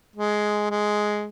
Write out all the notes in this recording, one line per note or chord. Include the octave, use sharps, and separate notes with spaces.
G#3
G#3